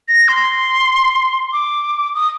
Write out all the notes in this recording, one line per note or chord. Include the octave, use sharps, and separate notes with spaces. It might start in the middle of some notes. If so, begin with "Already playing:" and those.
A#6
C6
D6
D#6